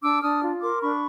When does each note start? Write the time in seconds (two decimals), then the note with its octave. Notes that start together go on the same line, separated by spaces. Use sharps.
0.02 D4 D6 E6
0.22 D4 D#6 F6
0.42 F4
0.61 A#4 C6 D6
0.81 D4 B5 C#6